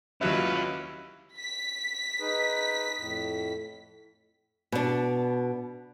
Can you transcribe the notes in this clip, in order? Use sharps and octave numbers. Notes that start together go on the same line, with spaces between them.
D#2 F#3 C#4 E4 F4 B4
B6
D#4 G#4 B4
F2 A2
B2 D4